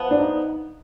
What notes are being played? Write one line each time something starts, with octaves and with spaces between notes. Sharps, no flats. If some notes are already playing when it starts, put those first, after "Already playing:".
Already playing: F3 B3
D4
D#4